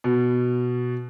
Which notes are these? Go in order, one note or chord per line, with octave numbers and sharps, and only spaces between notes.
B2